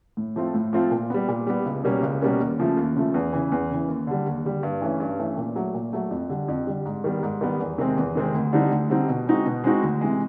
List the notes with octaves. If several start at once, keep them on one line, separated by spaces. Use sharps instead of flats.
A2
F3 A3 C4 F4
A2
F3 A3 C4 F4
A#2
G3 B3
A#2
G3 B3
C#2
B2 G3 A#3 C#4
C#2
B2 G3 A#3 C#4
D#2
C#3 F3 A3
D#2
C#3 F3 A3
E2
C#3 E3
E2
C#3 E3
D#2
D3 G3
D#2
D3 G3
G2
E3 A3 C#4
G2
E3 A3 C#4
A#2
F#3 A3
A#2
F#3 A3
F2
D3 G3
F2
D3 G3
G#2
D#3 G3 B3
G#2
D#3 G3 B3
E2
C3 D#3 G#3 C4
E2
C3 D#3 G#3 C4
D2
D3 G3 C4 D#4
D2
D3 G3 C4 D#4
B2
G#3 C4 D#4 F#4
B2
G#3 C4 D#4 F#4
D2
C3 E3 G#3